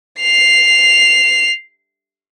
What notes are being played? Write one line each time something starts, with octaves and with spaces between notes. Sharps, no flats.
C7 F7